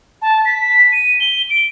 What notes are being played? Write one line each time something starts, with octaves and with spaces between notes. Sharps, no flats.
A5
B6
D#7
G7
D7